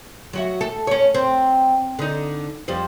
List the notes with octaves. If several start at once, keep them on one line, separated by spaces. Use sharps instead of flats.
F#3 F#4 E5
A4
C#4 C#5
C4
D3 D#4
F2 G3 C5